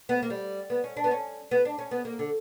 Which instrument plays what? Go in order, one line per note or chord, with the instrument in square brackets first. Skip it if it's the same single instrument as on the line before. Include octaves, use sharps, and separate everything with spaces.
[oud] B3
A#3
G3
B3
C#4
D4
B3
C#4
B3
D4
C#4
B3
A#3
D3